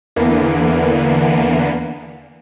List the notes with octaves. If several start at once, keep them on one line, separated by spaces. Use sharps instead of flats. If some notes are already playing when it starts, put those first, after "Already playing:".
E2 D3 E3 A#3 B3